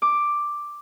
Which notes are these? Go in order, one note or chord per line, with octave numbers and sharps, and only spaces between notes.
D6